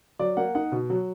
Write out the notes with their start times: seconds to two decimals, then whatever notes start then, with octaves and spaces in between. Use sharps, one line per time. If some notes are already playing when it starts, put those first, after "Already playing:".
0.19 F#3 D5
0.37 A#3 F#5
0.55 D#4 F#5
0.72 B2
0.90 F#3